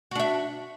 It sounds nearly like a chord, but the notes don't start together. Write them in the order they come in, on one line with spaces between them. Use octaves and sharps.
F#4 D4 E5